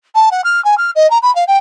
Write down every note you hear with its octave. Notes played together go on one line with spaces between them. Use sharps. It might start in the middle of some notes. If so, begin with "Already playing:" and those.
A5
F#5
F6
G#5
F6
D#5
A#5
B5
F5
G5